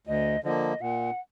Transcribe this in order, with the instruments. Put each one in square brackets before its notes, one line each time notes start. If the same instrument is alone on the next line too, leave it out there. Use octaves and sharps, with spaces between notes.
[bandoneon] D2 [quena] D#5
[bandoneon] D3 F3 A#3 [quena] D#5
[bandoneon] A#2 [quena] F#5